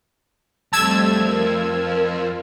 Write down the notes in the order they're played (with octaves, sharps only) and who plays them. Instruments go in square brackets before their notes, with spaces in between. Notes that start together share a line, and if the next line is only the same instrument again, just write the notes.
[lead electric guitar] F2 [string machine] G3 A3 C4 [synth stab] A5 E6 G#6
[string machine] F4 [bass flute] A#4